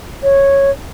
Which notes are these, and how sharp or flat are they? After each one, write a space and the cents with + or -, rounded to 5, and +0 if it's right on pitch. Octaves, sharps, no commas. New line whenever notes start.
C#5 -10